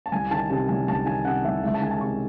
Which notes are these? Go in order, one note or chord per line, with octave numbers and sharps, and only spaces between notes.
A5
C2 G#5
D#3 A5
C3 A5
C2 G#5
C2 A5
D#3 G#5
C3 F#5
C2 E5
C#2 E5
A5
D#3 G#5
A5
C3 C#6